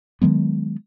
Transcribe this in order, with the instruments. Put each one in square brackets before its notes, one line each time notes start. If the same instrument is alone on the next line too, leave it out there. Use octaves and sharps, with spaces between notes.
[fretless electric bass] D#3 F#3 G#3 B3